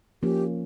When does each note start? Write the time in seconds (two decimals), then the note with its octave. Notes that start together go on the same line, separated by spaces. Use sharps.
0.23 F3 A#3 C#4 G4